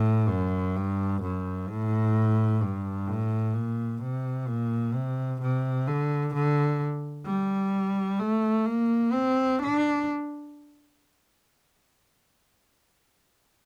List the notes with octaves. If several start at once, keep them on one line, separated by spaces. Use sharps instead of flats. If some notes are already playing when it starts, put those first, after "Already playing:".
Already playing: A2
F#2
G2
F#2
A2
G2
A2
A#2
C3
A#2
C3
C3
D3
D3
G3
A3
A#3
C4
D4